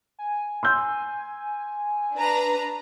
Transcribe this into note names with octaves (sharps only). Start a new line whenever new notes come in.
G#5
C6 E6 G6
D4 B4 A#5